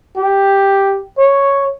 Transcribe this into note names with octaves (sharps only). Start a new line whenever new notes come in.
G4
C#5